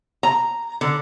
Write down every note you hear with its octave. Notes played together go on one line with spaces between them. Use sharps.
A#5
D3